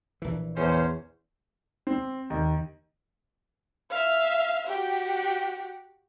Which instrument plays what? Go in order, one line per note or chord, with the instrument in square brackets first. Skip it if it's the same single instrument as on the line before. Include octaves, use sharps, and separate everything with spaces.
[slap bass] A#1 E3
[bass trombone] E2 [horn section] C#4 C5
[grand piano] C4
D#2
[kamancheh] E5 F5
F#4 G4